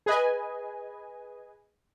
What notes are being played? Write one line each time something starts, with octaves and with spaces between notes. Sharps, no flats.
G#4 B4 D#5 G#5